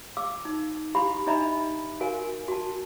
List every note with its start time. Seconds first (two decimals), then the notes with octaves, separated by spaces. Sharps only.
0.17 F5 D6 E6
0.45 D#4
0.95 E4 G4 F5 B5 C6
1.27 D4 D#4 D#5 E5 A#5 B5
2.01 F#4 A#4 F5 G#5
2.48 F#4 A5